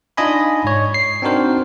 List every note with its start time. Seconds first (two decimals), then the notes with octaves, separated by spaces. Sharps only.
0.17 D4 D#4 F4 D#5 G#5 B5
0.65 G#2 C#5
0.94 C7
1.22 C4 D4 D#4 F#4 A#4 C5